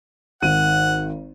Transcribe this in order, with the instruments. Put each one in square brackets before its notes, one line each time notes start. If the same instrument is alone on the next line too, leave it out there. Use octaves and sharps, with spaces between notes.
[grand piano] G#1 D#3 D#7 [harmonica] F#5